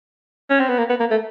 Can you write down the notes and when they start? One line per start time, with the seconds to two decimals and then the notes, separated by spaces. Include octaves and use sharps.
0.50 C#4
0.60 C4
0.69 B3
0.78 A#3
0.89 B3
1.00 A#3
1.11 A3